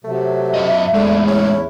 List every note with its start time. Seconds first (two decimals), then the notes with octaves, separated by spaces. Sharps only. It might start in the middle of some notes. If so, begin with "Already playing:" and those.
0.04 C3 F#3 A3 E5
0.54 F#2 D#5
0.94 E2 A2 D3 G#3 E4
1.28 C#4